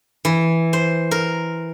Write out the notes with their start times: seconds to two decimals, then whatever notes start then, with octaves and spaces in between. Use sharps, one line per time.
0.25 E3
0.73 C5
1.11 A#4